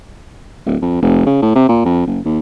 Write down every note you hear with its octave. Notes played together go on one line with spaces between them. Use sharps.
D1
F2
F1
C#3
A2
C3
A#2
F2
F#1
D#2